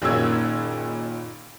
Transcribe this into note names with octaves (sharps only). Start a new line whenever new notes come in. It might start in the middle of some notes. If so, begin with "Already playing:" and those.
F#1 A#2 D#3 C#4 E6 G#6